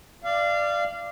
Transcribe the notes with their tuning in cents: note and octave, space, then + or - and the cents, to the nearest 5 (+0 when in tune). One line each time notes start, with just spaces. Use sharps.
D5 +5 F5 -25